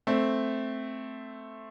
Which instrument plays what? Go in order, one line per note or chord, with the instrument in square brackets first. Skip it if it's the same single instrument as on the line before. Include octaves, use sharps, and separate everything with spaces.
[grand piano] A3 C4